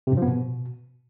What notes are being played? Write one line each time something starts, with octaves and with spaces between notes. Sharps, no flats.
C3
G2
F3
B3
B2